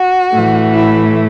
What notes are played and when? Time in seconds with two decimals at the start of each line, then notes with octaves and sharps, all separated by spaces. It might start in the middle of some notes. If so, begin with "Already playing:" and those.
Already playing: F#4
0.33 A2 E3 A3
0.74 E4